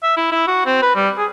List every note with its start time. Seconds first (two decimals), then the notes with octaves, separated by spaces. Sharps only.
0.03 E5
0.17 E4
0.32 E4
0.47 F#4
0.66 C4
0.82 B4
0.96 G3
1.18 G#4